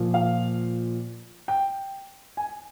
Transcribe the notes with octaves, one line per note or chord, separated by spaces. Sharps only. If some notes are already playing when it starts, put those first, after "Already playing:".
Already playing: A#2 F3
F5
G5
G#5